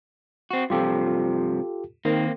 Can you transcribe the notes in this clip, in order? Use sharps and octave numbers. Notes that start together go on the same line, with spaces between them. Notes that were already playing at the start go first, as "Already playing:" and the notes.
C4 F#4
G2 C3 F3 F4 G4 A4
D#3 A#3 C4